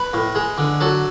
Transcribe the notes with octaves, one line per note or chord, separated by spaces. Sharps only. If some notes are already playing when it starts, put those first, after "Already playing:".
Already playing: B4
A2
G#3
D3
F#3 A4